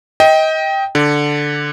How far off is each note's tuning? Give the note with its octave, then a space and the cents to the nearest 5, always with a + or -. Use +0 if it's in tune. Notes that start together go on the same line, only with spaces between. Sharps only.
D#5 +25 G5 +0
D3 +0 D5 +0